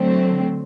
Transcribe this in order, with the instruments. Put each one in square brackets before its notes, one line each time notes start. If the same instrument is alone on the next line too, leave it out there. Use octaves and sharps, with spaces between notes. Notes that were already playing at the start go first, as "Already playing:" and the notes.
Already playing: [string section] D3 F#3 A3 C4